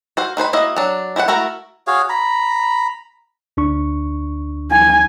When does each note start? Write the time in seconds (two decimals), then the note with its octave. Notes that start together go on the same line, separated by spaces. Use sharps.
0.17 F#4 C5 F5
0.37 D#3 B4 C5 B5
0.53 A#3 E4 F#4 D#5
0.76 F#3 D4
1.16 E4 F#4 C5 F#5
1.28 A3 E4 F#4 A#4
1.87 F#4 G#4 C#5 F5
2.09 A#5 B5
3.57 D2 D4 C#6
4.71 G#5